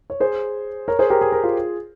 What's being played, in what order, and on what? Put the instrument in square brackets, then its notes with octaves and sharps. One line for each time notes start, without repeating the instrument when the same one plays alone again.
[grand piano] C#5
G#4 C5
A#4 C#5
G#4 C5
G4 A#4
G#4
A#4
F4 G#4